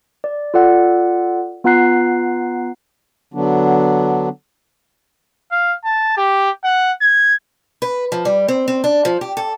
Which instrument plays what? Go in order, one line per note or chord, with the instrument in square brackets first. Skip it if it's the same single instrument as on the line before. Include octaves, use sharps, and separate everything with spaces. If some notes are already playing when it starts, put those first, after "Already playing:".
[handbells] D5
F4 A4 D5 F#5
B3 F4 F#5 A#5 F#6 C7
[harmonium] D3 F#3 B3 D4
[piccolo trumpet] F5
A5
G4
F#5
G#6
[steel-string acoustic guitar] B4
F3
G3
C4
C4
D4
F3
G4
A4